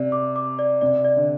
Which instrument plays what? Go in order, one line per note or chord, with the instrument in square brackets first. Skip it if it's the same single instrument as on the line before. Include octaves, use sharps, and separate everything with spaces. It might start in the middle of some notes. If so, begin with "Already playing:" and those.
Already playing: [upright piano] C3 [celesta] D5
[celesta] D6
D6
D5
[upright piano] C3 [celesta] D5
[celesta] D5
[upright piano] D3